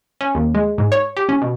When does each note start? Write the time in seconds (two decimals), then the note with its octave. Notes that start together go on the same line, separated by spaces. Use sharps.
0.21 C#4
0.35 D#2
0.55 G#3
0.78 G#2
0.92 C#5
1.17 G4
1.29 C#4
1.42 B2